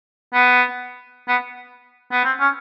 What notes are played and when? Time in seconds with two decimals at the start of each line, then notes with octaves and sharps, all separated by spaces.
0.34 B3
1.29 B3
2.12 B3
2.25 C4
2.40 C#4